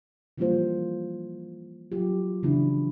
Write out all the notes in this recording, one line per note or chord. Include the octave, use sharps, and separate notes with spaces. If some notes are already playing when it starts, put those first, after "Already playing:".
E3 F3 G3 A#3 F4 C5
F#3 F4 G4
C#3 E3 F3 B3 D4 E4